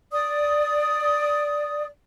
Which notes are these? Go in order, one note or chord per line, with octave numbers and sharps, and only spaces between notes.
D5 D#6